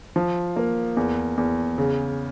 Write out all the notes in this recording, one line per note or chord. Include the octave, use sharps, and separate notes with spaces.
F3
A#3
E2
E2
C#3